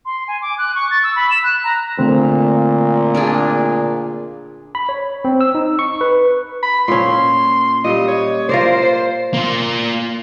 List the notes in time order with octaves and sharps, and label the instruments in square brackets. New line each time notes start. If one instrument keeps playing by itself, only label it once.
[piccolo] C6
G#5
D6
F#6
C#6
A6
E6
B5
E7
F#6
A#5
[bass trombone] A#2 [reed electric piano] D3 A3 C4
[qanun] D4 F4 G#4
[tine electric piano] B5
C#5
C4
E6
D#4
C#6
B4
[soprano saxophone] B5
[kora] A#2 C#4 [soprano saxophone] C6
[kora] A#2 G3 [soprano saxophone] D#5
[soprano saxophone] C#5
[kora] F4 A#4 D5 [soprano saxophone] C5
[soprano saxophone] C5
[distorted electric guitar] A#3 F4